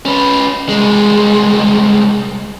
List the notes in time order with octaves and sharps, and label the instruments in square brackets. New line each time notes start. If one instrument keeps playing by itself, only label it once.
[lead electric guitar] C#4 B4
C2 G#3